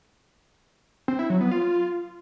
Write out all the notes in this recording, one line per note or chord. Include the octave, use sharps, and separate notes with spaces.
C4
E4
F#3
B3
F4